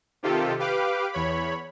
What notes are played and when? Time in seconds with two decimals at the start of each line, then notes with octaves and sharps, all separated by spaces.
0.23 C3 D#3 F4 G4 A4
0.59 G4 B4 F5 D6
1.13 E2 C#5 B5